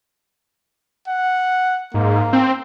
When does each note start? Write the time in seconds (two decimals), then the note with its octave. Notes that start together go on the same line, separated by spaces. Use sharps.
1.08 F#5
1.94 G#2 A#3
2.33 C4